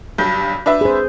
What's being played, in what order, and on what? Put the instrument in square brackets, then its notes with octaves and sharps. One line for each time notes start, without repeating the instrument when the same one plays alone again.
[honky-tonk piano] B1 G2 G6
D4 B4 E5
[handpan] G#4 C5